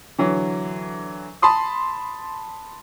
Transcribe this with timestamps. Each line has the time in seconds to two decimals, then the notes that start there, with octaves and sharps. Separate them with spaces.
0.19 D3 E3 F#3
1.42 A5 B5 C6 D#6